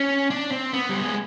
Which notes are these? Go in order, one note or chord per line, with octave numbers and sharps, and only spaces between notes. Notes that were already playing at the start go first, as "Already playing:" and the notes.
Already playing: C#4
D4
C4
B3
G3
G#3